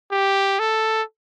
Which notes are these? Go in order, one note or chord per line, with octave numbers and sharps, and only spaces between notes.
G4
A4